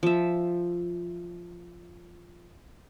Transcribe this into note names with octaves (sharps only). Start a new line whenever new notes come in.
F3 E5